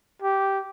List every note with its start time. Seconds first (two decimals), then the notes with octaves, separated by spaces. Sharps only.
0.22 G4